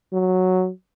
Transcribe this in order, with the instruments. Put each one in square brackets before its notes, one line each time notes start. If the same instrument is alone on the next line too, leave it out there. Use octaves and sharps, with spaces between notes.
[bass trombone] F#3